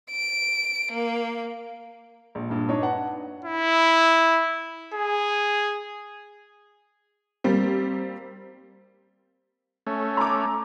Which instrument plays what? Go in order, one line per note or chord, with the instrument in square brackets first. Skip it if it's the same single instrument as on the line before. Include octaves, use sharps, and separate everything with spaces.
[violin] D7
A#3
[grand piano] A#1
A#1 G2
D4 D#4 C#5 D#5
B4 F#5 A5
[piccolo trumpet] E4
G#4
[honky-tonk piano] G3 A#3 C4
[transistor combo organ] A3 C#4
[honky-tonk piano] A#5 D6